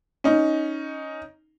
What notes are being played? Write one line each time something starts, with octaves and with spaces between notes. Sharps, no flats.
C#4 D#4